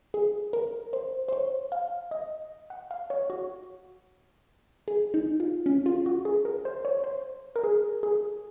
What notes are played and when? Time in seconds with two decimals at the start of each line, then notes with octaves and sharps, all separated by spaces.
0.14 G#4
0.53 A#4
0.93 C5
1.28 C5
1.33 C#5
1.72 F5
2.11 D#5
2.70 F#5
2.91 F5
3.10 C#5
3.30 F#4
4.88 G#4
5.14 D#4
5.40 F4
5.66 C#4
5.86 F4
6.06 F#4
6.25 G#4
6.45 A#4
6.65 C5
6.85 C#5
7.04 C5
7.56 A#4
7.64 G#4
8.03 G#4